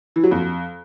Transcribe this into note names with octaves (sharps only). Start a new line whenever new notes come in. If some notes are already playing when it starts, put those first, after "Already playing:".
E3
F#3
F2